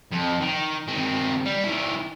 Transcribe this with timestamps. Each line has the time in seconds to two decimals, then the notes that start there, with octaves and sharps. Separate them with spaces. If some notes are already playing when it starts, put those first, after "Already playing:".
0.11 F2
0.40 D#3
0.88 D#3 C4
1.46 G3
1.64 D#3 E4